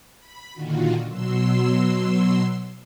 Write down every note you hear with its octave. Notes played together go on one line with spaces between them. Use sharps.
B5
A#2 D3 D#3 F4 F#4
B2 F#3 C6 E6